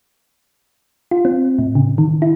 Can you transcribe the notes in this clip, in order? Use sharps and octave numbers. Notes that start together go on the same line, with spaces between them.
F4
C4
A2
C#3
D#3
E4